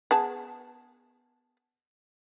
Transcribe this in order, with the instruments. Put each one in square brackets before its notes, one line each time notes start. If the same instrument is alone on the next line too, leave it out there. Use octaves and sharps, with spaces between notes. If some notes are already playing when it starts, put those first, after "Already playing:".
[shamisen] B3 G#4 A5